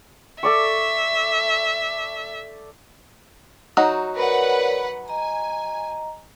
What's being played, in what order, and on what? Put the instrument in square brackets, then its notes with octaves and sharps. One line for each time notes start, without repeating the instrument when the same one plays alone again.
[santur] A4 D5 C#6 [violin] E5
[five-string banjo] F#3 D#4 F#4
[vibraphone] A#4 C#5 D5 [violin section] B4 F#5
[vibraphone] D#5 A#5 [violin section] G#5